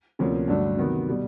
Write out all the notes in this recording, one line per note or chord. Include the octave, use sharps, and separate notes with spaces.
D2 C3 F3 A#3 C#4
G2 D3 F#3 A3 D4
C3 D#3 F#3 B3
B2 G3